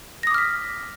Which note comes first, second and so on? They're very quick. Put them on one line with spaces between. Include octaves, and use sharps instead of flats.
A#6 D#6 D6 F6 B6